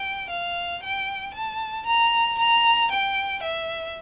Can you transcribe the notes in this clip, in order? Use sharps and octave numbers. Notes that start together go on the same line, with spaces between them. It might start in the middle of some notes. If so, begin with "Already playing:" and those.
Already playing: G5
F5
G5
A5
A#5
A#5
G5
E5